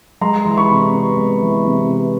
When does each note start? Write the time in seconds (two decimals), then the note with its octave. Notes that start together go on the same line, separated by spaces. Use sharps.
0.21 G#3 A#5 C6
0.45 E3
0.57 B5 C#6
0.70 C3
0.93 B3
1.17 G#3
1.41 E3
1.65 C3
1.89 B3